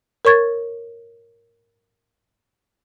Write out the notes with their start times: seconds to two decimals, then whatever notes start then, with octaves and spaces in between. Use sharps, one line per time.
0.25 A#4 C#5 C#6 G#6 A6